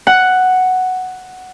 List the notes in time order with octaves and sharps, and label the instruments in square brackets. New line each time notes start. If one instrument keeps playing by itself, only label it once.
[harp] F#5